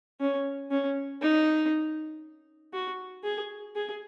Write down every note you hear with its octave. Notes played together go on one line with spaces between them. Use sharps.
C#4
C#4
D#4
F#4
G#4
G#4